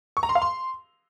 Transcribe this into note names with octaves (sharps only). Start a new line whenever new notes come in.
C#6
A#5
C6
F5
C6